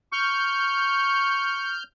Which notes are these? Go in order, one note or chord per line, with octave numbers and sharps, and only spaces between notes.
C#6 F6 G6